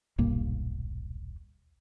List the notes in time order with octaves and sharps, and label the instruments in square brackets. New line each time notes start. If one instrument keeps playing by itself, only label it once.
[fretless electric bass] D#1 B1 G2 A#3